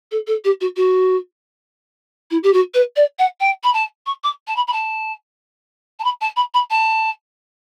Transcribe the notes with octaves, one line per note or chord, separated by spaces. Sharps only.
A4
A4
G4
F#4
F#4
E4
G4
F#4
B4
D5
F#5
G5
B5
A5
C#6
D6
A5
B5
B5
A5
A5
B5
A5
B5
B5
A5